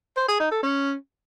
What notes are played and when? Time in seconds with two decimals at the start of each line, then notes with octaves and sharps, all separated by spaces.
0.17 C5
0.28 G#4
0.40 D#4
0.51 A4
0.63 C#4